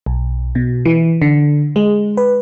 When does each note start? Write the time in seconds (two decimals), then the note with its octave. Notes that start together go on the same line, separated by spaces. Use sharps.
0.06 B1
0.55 B2
0.85 E3
1.22 D3
1.76 G#3
2.17 B4